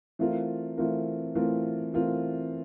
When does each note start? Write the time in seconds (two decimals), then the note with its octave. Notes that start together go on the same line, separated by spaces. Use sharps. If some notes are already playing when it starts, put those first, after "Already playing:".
0.19 E3 A3 C4 F4 A#4
0.77 E3 A3 C4 F4 A#4
1.35 E3 A3 C4 F4 A#4
1.94 E3 A3 C4 F4 A#4